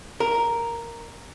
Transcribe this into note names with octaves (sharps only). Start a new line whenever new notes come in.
A#4